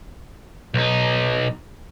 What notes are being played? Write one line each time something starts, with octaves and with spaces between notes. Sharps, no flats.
B1 D#4